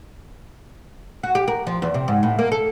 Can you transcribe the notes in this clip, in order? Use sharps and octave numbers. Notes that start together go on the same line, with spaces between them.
F#4
G4
A#4
F3
E2
C3
G#2
A2
A#3
A4